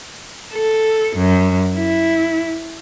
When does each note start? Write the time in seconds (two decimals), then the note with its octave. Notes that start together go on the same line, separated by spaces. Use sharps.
0.53 A4
1.16 F#2
1.76 E4